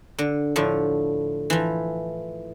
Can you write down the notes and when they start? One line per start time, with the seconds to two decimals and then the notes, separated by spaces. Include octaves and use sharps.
0.19 D3
0.56 A2 D3 F3
1.50 E3 F3